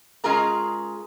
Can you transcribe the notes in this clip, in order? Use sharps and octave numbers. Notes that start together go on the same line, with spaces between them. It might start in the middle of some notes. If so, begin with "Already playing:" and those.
G#3 C#4 F4 G#4 A#4 A#5